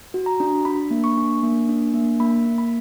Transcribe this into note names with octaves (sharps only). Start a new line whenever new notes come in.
F#4
A#5
D4
D4 B5
A#3
C#6
D4
A#3
D4
A#3
A#3 B5
A#3
B5